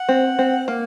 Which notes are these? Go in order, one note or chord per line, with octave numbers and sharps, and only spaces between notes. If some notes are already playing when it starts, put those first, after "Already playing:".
Already playing: F#5
C4
C4
A#3 F5